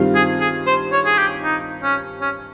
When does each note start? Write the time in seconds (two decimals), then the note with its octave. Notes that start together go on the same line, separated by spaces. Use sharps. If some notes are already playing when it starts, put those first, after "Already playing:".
Already playing: G2 D#3 G3 C4 F4
0.15 G#4
0.41 G#4
0.67 C5
0.93 C#5
1.06 G#4
1.18 G4
1.44 D#4
1.83 C#4
2.22 C#4